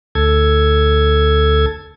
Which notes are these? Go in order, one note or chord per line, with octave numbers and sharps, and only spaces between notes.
D2 A4 G#6